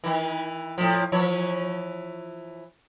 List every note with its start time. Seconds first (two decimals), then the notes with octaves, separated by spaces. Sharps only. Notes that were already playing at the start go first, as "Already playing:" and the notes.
0.04 D#3 E3
0.78 A2 F3
1.12 E3 F3 C#5